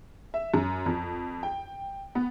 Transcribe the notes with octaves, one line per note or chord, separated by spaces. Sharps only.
E5
F#2
F2
G5
B3